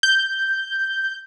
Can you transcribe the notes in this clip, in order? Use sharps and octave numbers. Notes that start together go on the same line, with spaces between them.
G6